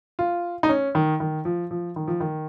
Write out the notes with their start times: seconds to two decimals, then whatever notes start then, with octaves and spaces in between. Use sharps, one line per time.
0.19 F4
0.63 D#4
0.69 C#4
0.95 D#3
1.20 D#3
1.45 F3
1.71 F3
1.96 D#3
2.08 F3
2.20 D#3